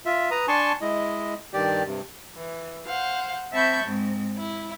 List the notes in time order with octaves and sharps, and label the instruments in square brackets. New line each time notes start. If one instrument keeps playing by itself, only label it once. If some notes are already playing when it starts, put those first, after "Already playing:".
[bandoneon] F4 E5
B4 A#5 D#6
D4 G#5 A5 C6 C#6
G#3 E4 D#5
G2 D#3 G4 D5
G2 C3
[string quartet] E3
C5 F5 F#5
C4 E5 A5 B5 C#6 G6
G#2 C4
E4